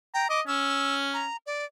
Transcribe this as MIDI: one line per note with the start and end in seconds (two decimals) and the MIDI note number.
0.14 0.29 79
0.14 0.26 82
0.29 0.41 75
0.29 0.40 86
0.47 1.26 61
0.47 0.95 88
1.14 1.37 82
1.46 1.65 74